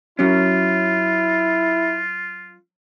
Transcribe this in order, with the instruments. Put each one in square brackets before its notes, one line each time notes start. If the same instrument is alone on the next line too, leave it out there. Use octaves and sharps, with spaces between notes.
[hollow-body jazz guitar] F#3 C#4 [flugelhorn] E4 [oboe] F4